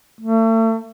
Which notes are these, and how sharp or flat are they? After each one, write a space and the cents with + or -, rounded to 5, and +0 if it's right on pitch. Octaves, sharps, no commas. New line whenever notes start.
A3 +35